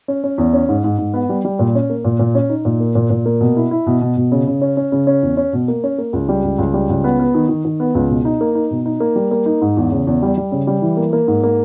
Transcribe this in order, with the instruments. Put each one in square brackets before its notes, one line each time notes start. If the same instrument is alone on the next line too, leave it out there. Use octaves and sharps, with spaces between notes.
[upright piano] C#4
C#4
E2
C#4
G#2
G#2
G#2
B3
G3
G3
A#2
C#4
A#3
A#2
A#2
C#4
D#4
A#2
A#3
A#2
A#2
A#3
B2
E4
E4
B2
B2
B2
C#3
C#3
C#4
C#4
C#3
C#4
E2
C#4
B2
A#3
C#4
A#3
C#2
G3
C#2
C#2
G3
C#2
B3
B3
D#3
D#3
D#3
B3
C#2
B2
D#4
A#3
D#4
B2
D#4
A#3
G3
A#3
D#4
G#2
E2
C#3
E2
G3
G3
C#3
G3
E3
A#3
A#3
G#2
A#3